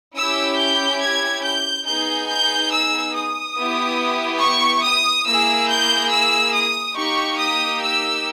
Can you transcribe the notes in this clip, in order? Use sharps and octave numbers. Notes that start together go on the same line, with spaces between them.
C#4 E4 G4 E6
G6
G#6
G6
B3 D#4 G#4 G6
G6
E6
D#6
B3 E4 G4
C#6
D#6
A#3 E4 G#4 E6
G6
E6
D#6
A#3 D#4 G4 C#6
D#6
E6